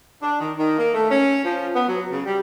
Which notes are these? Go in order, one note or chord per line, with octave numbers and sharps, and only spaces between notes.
D4
D#3
D#3
A#3
A3
C#4
F3
B3
F#3
C#3
G3